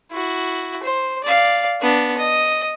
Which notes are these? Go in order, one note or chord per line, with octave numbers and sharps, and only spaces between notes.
E4 F#4
C5
D5 F5
B3 D4
D#5